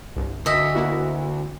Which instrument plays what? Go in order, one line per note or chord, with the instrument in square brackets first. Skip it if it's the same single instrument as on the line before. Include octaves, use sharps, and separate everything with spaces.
[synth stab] G1 C2
[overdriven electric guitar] D2 [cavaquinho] D#5 E5
[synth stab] A#3 E4 F#4